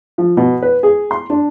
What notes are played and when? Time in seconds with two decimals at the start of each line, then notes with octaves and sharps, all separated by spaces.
0.18 F3
0.37 B2
0.62 B4
0.83 G#4
1.11 C6
1.30 D4